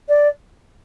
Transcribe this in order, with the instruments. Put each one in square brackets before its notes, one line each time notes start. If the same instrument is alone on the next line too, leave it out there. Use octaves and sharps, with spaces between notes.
[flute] D5